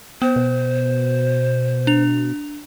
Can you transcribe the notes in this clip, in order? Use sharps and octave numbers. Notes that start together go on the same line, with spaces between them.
B3 C5
B2
D4 F7